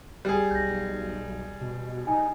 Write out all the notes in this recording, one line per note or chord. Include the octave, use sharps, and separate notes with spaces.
G3 G#4
B1 G6 A#6
B2
D#4 G#5